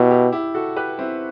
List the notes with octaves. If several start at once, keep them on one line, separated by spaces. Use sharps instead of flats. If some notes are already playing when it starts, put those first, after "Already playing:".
Already playing: B2 E4 G4
E4 G4
E4 G4
F#4 A4
G4 B4
C4 E4